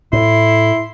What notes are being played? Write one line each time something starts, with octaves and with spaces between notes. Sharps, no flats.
A2 E4 C6